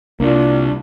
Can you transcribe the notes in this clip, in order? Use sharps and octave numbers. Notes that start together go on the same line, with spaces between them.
C2 A#3 D4 F4